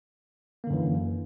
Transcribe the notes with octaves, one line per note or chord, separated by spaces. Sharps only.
F#2 D3 E3 A#3